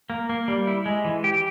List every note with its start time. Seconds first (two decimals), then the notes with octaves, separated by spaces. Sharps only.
0.10 A#3
0.29 A#3
0.48 G3
0.67 E4
0.86 G#3
1.05 E3
1.24 G4